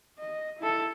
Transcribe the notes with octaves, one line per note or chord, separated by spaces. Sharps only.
D#5
E4 A4